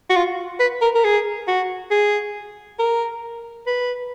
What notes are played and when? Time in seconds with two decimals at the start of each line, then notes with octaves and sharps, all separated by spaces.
0.10 F#4
0.16 F4
0.60 B4
0.82 A#4
0.95 A#4
1.04 G#4
1.48 F#4
1.91 G#4
2.79 A#4
3.67 B4